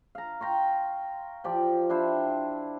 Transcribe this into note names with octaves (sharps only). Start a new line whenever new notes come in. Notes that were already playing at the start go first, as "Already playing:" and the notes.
F5 A#5
G5 A#5 C6 C#6
F3 G4 D5
D4 E4 C5